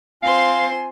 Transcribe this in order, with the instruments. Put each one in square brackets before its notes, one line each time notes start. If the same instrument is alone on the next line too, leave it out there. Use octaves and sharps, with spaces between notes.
[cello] C4 C5 [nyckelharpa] F4 C6 [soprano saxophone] F5 [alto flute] G#5